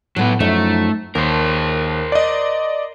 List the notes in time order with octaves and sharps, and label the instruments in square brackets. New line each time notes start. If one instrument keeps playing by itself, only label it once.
[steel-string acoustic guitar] A2 B3 [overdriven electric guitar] F#3 B4
[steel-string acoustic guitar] F#2 F3 D#4 [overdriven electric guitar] A3
[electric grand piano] D#2 [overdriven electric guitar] A#4 C5 [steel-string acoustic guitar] A5
[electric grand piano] D5 D#5